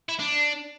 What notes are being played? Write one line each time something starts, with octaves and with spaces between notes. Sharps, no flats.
E4
D4